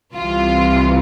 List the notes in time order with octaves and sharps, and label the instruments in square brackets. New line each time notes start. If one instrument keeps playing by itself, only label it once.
[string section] C2 C3 E3 F4